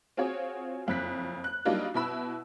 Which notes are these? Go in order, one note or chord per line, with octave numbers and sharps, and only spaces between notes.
C4 F4 F#4 G#4 C#5
F#1 F2 F#6 B6
F#6
F#3 G3 A#3 D4 D#4 F4
B2 E4 B5 E6